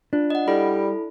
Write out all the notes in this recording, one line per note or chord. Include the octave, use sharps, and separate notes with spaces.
D4 F4
D#5 F#5
G3 E4 A4 B5